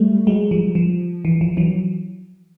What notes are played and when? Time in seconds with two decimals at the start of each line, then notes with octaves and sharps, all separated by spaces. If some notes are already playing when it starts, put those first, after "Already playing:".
Already playing: G3 A3
0.27 F#3 G#3
0.51 F3 G3
0.75 F3
1.25 E3
1.41 F3
1.57 E3 F#3